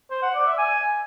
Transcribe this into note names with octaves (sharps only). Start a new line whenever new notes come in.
C5
F#5
D5
E5
G#5